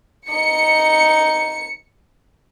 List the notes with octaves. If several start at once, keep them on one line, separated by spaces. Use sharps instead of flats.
D#4 C#7